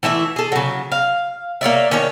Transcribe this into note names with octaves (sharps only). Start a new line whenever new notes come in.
E3 A3 E4 E5
G#4 A4
C#3 F#3
F5
A#3 C#5 D5 E5
D#3 C#4 D4 C#5